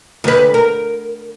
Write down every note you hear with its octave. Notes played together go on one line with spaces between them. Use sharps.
D2 B4
A#4